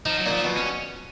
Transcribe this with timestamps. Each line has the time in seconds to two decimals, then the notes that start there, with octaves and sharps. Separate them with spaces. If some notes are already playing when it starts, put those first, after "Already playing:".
0.05 F3 D#4
0.19 F#3
0.26 A#2
0.31 F3
0.44 B2
0.57 C#4